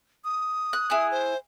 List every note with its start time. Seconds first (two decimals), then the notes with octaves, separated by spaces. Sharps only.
0.25 D#6
0.73 F#6
0.90 E4 G#4 F#6
1.11 C5